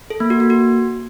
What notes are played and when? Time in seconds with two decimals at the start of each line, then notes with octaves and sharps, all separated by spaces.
0.10 A4
0.20 A#3
0.30 F#4
0.40 A#3
0.50 F#4